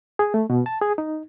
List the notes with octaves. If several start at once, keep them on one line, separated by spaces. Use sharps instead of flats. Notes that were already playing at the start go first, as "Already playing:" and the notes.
G#4
A3
B2
A5
G#4
D#4